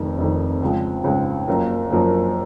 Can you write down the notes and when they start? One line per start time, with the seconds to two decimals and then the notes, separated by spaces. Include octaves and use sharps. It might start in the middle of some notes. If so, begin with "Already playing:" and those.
Already playing: F1 F2 D#3
0.18 F1 F2 D#3
0.62 C#2 C#3 F3 G#3
1.04 C#2 C#3 F3 G#3
1.48 F#1 F#2 F3 A#3
1.90 F#1 F#2 F3 A#3